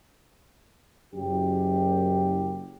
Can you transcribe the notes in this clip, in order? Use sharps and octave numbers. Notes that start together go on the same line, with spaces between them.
F#1 F#2 G4